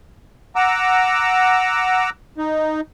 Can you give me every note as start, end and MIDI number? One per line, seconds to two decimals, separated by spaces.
0.56 2.10 78
0.56 2.10 82
0.56 2.10 86
0.56 2.10 88
2.38 2.81 63